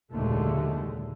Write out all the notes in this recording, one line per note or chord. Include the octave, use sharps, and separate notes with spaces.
F#1 D#2 A#2 D3 G#3 A3